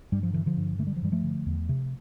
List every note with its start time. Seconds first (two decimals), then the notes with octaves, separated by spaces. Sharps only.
0.12 G2 G3
0.23 F3
0.34 D3 E3
0.46 D3 F3
0.57 G2
0.79 D3 A3
0.87 G3
0.96 F3
1.02 G2 E3 G3
1.12 F3 A3
1.23 D3
1.46 E2
1.69 C3